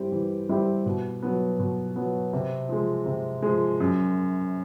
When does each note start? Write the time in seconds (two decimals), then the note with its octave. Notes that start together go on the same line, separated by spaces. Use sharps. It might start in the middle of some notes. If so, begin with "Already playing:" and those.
Already playing: G3 C4 E4 G4
0.12 E3
0.49 G3 C4 E4 G4
0.86 B2
1.23 F#3 B3
1.59 B2
1.96 F#3 B3
2.33 C3
2.69 F3 G#3
3.06 C3
3.42 F3 G#3
3.80 F#2